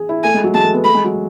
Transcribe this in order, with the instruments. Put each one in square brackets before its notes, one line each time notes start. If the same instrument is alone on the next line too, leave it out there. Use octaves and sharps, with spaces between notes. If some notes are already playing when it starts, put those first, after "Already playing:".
Already playing: [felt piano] G#4
E4
[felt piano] A3 [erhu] G#5
[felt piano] G#3
F#3
[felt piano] G#3 [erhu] A5
[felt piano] A3
B3
[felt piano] A3 [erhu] B5
[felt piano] G#3
F#3